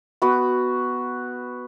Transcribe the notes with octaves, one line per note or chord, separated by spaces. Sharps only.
B3 F#4 B4